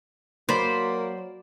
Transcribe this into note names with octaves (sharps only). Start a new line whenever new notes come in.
F#3 A#3 C5 D5 B5